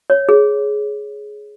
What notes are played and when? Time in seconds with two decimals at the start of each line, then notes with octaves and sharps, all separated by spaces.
0.10 C#5
0.29 G#4